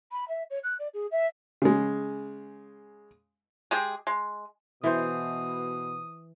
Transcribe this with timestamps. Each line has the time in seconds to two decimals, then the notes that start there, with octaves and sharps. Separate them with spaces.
0.11 B5
0.28 E5
0.50 C#5
0.63 F#6
0.79 D5
0.94 G#4
1.11 E5
1.62 C#3 G#3
3.71 G#3 G4 G#4
4.07 G#3
4.84 B2 E3 C5 D#6